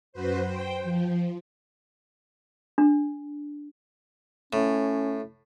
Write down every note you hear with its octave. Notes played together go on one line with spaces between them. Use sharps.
F#2 F#4 B4 C5
C5 G5
F3
D4
A2 C#4